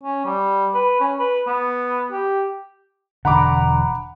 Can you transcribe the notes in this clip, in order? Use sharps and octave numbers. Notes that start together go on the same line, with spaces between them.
C#4
G3
B4
C#4
B4
B3
G4
E1 D3 F#5 A#5 B5 D6